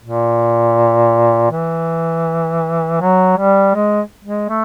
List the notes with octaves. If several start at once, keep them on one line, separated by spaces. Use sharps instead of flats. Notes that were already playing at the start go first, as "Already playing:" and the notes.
A#2
E3
F#3
G3
G#3
G#3
A3